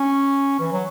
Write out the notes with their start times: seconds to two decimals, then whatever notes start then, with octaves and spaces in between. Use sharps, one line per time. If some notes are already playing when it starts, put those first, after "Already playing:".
Already playing: C#4
0.60 E3
0.72 F#3